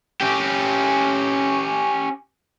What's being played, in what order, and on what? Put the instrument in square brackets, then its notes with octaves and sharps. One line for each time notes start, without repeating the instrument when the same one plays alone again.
[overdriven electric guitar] C#4 G4